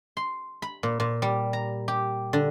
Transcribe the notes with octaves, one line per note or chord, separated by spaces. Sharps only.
C6
B5
A#2
A#2
G3
A#5
G4
D3